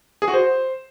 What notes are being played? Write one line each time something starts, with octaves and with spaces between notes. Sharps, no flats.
G#4
F#4
C5